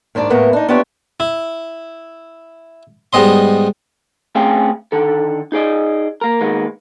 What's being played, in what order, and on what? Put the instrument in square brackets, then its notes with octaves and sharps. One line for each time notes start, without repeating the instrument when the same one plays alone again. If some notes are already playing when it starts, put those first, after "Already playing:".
[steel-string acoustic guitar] D#2 G#2 D4 D5
E2 A2 E3 A#3 B3
D4 D#4
B3 D4 E4 F4 G4 C#5
[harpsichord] E4
G#2 G3 B3 D#5 C6
[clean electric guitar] A3 C4 C#4 G#4 F5 G5
D3 D#3 A4
D#4 G#4 D5 D#5
A#3 A#4
D#3 G#3 A#3 B3